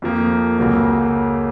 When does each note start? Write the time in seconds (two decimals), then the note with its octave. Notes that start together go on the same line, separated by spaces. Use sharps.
0.02 F2 F3 A#3
0.58 C#2 C#3 F#3 A#3